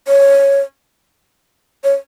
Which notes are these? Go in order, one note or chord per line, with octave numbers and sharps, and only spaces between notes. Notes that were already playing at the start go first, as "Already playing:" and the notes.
C#5
C#5